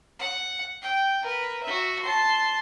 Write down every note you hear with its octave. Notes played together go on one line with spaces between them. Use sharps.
F#5
G5
A#4 B4
F#4 E5
A5 C6